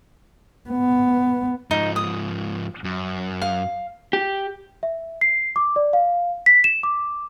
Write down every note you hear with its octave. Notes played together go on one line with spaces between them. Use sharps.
B3
G#2 F3 D#4
D#6
F#2
F5
G4
E5
C7
D6
D5
F5
B6
E7
D6